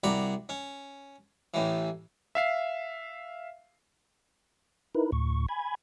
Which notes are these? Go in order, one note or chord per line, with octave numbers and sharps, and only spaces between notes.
C2 F#4 D5 A#5 B5
C#4
A1 A2 E3
E5 F5 C7
D#4 E4 A#4 B4
D2 A2 C#6
G#5 B5 G#6